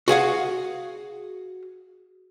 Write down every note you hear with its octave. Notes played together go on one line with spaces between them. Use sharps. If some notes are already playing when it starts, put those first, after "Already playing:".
F#4 G#4 F5 F#5